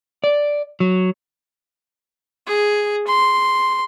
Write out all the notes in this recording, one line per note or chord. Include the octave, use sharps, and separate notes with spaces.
D5
F#3
G#4
C6